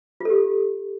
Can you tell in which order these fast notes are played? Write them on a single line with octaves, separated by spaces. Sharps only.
F4 A4 G4